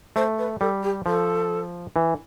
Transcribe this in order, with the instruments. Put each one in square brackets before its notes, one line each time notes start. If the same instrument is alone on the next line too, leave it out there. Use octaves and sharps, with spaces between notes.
[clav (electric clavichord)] A3 [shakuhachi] C5
[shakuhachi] B4
[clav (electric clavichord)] G3 [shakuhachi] A4
[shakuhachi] G4
[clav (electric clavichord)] F3 [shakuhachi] A4
[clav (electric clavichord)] E3